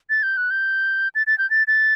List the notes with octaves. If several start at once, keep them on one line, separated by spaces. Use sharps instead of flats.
A6
G6
F#6
G6
A6
A6
G6
A6
A6